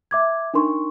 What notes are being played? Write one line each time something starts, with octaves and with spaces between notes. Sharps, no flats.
E5 D6 G#6
D4 D#4 A#4 C6 C#6